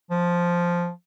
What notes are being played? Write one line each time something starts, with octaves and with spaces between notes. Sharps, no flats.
F3